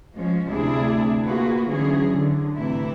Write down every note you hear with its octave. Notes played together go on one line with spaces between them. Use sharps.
F3 G#3 C#4
D2 C3 D4 E4 G#4
A#3 F4 F#4 G#4 B4
D3 E3 F#3 C#4 G#4
D3
A2 C3 E3 A3 E4